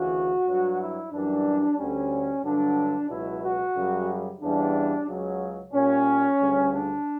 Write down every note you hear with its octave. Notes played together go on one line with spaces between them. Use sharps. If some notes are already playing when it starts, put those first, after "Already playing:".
Already playing: D2 C#3 E3 F#4
G2 F#3
E4
F#2 E3 G3 D4
D2 D3 G3 C#4
G2 D3 F#3 D4
C#2 B2 F#3 E4
F#4
F#2 C#3 G3
E2 C#3 E3 G3 D4
C#2 C#3 F#3
A#2 G3 C#4
D2 C#3 G3
D4